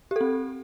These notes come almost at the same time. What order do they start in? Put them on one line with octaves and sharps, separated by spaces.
G4 A4 C4